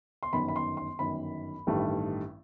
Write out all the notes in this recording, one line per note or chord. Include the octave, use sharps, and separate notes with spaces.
C6
G1 F#2 D#3 B5
B5
C6
C6
G1 F#2 D#3 B5
A1 G2 D#3 A3